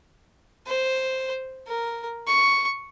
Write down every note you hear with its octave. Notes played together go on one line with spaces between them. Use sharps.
C5
A#4
C#6